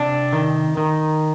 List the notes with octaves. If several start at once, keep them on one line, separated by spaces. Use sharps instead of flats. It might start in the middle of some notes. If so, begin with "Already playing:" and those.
Already playing: C3 D4
D#3
D#3